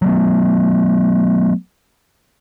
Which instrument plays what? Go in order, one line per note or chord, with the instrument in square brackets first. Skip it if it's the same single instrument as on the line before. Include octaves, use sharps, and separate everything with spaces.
[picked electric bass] F#3 A3 B3